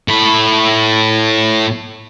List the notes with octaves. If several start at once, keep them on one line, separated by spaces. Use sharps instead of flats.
A2 B5